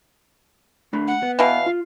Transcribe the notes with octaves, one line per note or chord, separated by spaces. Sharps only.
A3 D4 B5
F#5
B3
B2 E3 F5
F4